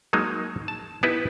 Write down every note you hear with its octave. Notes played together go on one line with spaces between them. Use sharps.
F#3 G#3 A#3 D#4
A5
B3 D#4 E4 G4 B4